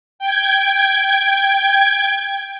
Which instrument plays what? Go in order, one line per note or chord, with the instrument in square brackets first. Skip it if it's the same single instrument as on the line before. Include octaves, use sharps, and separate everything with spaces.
[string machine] G5 G#6